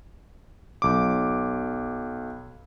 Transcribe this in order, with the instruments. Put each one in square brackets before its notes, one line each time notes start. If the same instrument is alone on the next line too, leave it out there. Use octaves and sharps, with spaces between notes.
[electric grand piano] B1 D6